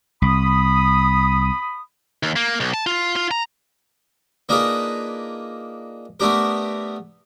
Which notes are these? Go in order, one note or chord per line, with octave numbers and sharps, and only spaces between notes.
C2 B5 D#6
D#2
A#3
B1
A5
F4
F4
A#5
A#3 D4 D#4 F4 G#4 B4
A3 B3 D4 G4 A#4